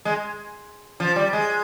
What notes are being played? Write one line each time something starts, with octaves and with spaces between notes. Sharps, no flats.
G#3
F3
G3
G#3